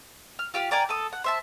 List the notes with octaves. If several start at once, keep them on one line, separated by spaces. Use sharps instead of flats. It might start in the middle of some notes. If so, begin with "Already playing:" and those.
F6
F4 G4 F5
A#4 D5 G5 G#5
A4 D#6
F#5
C5 E5 A5